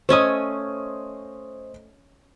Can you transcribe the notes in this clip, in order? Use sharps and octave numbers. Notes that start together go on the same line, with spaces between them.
A3 C#4 C5 D#5 G#5 D#6